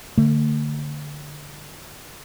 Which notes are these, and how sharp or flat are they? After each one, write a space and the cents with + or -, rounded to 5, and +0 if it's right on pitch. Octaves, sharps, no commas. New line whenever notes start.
D3 +0 A3 +40